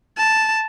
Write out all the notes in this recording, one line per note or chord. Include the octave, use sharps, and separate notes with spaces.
A5